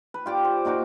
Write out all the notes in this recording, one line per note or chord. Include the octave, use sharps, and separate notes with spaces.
B4
F4 G4 D5
C5
A#2 D#4 F#4 D6